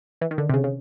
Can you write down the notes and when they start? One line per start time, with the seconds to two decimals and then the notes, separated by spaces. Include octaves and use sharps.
0.21 E3
0.31 D#3
0.38 D3
0.49 C3
0.54 C#3
0.64 C#3